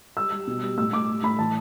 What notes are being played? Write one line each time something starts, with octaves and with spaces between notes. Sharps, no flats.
G3 E6
G3
B2
G3
A2 E6
A2 D6
G3
A2 B5
E3 A5